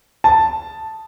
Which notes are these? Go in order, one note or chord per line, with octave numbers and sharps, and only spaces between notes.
A5